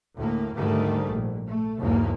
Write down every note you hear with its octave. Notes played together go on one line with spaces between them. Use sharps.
D2 A2 A#3
D2 G#2 D#3 G3 A3
A#1
A3
B1 E2 G#2 A#3